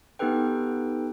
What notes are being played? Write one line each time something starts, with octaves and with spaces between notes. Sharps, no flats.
B3 D#4 G4 A4 B4 G5